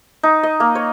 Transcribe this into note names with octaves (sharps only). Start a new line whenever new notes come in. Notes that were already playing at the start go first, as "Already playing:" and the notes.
D#4
D#5
A#3
C#5